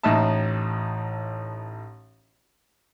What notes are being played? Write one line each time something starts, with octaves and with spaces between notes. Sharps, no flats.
A1 A2 D#4 E5 A5